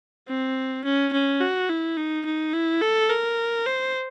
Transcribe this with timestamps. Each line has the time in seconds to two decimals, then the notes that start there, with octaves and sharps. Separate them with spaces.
0.28 C4
0.84 C#4
1.13 C#4
1.41 F#4
1.69 E4
1.97 D#4
2.25 D#4
2.53 E4
2.81 A4
3.10 A#4
3.66 C5